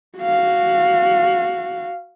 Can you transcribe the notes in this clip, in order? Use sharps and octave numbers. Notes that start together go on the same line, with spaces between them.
F#4 F5